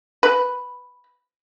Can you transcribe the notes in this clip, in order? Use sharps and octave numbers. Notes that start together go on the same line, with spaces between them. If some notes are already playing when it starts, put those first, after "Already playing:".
B4